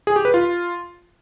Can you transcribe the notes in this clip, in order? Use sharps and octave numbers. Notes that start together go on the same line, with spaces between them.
G#4
G4
B4
F4